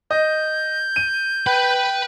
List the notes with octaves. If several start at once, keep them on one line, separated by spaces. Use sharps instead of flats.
D#5 G6
D#7
B4 G5 B5